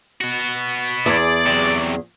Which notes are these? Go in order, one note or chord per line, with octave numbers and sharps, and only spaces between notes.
B3 F#4
E2 G#4 D5
C3 F#3